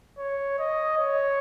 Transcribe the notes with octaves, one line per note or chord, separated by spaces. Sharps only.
C#5
D#5
C#5